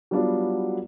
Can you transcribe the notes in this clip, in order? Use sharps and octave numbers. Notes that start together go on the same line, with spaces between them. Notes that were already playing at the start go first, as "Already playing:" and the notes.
F#3 G3 B3 D4 F4